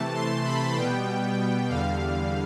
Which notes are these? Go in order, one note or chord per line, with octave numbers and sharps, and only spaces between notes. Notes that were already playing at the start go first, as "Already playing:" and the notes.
Already playing: C3 E3 A3 A5
C6
B5
B2 G3 B3 G5
E2 D3 G3 F5